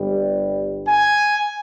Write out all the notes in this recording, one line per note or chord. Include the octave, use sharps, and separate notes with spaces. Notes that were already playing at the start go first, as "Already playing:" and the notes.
Already playing: G1 G2 G3
G#5